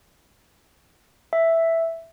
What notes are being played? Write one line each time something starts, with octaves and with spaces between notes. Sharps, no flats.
E5